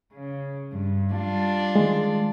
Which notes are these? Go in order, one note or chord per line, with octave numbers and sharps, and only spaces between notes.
C#3
G2
G3 D4 F4
D#3 G#3